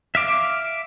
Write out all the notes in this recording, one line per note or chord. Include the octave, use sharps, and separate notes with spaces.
E5 F5 D6